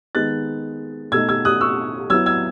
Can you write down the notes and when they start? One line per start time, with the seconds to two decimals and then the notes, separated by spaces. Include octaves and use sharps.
0.15 D#3 G#3 B3 D#4 F#6 A6
1.12 B2 A3 D#4 E6 G#6
1.29 E6 G#6
1.45 D#6 F#6
1.61 C#6 E6
2.10 F#3 B3 E4 E6 G#6
2.26 E6 G#6